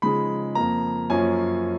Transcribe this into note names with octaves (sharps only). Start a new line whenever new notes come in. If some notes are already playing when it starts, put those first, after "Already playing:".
C#3 F3 G#3 D#4 B5
F2 F3 A#3 A#5
F#2 F3 A#3 C#4 G#5